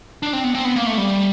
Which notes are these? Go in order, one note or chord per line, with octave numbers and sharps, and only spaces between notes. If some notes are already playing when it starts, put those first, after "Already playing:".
D4
C4
B3
C4
B3
A#3
A3
G3